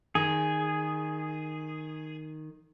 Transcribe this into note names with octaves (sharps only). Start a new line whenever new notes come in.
D#3 G#4